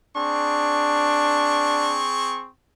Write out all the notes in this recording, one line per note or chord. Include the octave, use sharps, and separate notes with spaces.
C4 D4 G#4 C#6